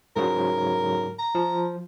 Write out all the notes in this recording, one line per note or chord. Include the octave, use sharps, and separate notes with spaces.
G#2 C#3 F#3 A#4
A#5
F3